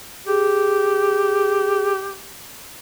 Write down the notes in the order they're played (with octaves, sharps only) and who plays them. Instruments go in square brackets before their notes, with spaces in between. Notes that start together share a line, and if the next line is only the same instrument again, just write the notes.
[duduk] G4 [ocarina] G#4